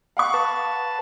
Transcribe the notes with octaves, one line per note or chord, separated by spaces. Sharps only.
F5 F#5 C#6
B4 A5